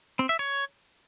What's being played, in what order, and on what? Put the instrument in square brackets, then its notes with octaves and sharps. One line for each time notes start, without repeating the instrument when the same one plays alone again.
[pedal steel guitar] C4
E5
C#5